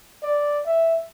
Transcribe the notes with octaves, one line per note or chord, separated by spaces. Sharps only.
D5
E5